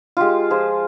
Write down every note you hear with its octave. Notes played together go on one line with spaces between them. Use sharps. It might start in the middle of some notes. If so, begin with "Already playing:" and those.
G#3 F4 G4
F3 G#4 C5